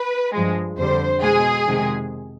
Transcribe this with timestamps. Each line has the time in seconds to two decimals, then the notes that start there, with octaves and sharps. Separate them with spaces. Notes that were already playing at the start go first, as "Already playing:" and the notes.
Already playing: B4
0.34 G2 F3 G#3
0.78 F2 D3 G3 C5
1.22 B2 G#3 G#4
1.66 F2 C3 D#3 G#3